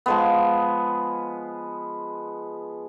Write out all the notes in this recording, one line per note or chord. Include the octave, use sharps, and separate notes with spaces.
F3 G#3 B3